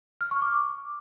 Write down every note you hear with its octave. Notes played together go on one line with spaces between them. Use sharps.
F6
C#6
D6